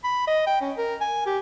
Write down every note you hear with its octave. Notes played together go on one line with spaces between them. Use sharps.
B5
D#5
G5
C#4
A#4
G#5
G4